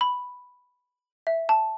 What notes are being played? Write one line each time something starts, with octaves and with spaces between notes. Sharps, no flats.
B5
E5
A5